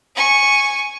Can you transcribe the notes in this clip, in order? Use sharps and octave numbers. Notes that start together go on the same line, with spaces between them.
G#5 C#6